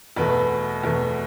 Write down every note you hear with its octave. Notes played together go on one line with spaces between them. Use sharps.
E2 B2 A3 B4
E2 B2 A3